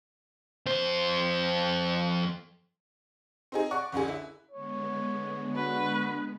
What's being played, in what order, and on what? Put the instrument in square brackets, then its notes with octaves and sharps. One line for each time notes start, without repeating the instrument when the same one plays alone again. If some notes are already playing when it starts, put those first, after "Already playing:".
[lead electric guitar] F2 C5
[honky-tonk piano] C4 D#4 G#4
D5 F#5 C#6 F#6
F#1 C#2 D3 G#4
E4
[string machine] D3 G#3 B3 [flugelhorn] C#5
[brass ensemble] D4 F#4 [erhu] B4